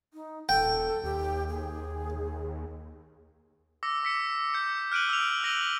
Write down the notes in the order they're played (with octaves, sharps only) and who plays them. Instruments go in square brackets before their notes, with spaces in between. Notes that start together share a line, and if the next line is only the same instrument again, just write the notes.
[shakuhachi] D#4
[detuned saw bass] D#1 [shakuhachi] A4 [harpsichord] G5
[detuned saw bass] D#2 [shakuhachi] G4
[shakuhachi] G#4
[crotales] D6 E6 A#6 C#7
D6 B6 C#7 E7
E6 G6 A#6 C#7
F6 F#6 D7 D#7 F#7
E6 F7
E6 A#6 D7 D#7 F#7 G7